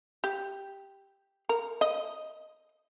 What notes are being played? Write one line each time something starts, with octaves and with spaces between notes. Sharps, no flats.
G4
A#4
D#5